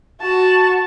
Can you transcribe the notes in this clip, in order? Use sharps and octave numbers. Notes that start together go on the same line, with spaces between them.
F#4 A5